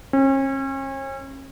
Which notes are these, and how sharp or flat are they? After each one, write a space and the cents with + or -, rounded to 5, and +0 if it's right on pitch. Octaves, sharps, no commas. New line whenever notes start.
C#4 -40